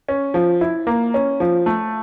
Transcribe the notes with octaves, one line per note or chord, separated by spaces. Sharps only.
C#4
F3
E4
A#3
C#4
F3
A3